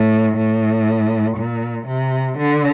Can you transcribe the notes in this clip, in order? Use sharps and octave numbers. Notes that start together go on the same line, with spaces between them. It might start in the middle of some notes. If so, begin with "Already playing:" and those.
Already playing: A2
A2
A#2
C3
D3